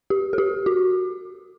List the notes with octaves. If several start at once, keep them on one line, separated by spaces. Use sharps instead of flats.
G4
A4
G4
F#4